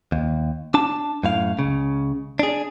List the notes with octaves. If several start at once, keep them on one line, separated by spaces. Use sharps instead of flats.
D#2
D4 A5
F#2 A2 F5
C#2 C#3
D4 G#4